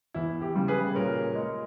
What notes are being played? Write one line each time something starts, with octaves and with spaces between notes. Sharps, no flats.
E2 E4
G4
C#3 G3
G#4 B4
A#2 A#4 C#5
G#3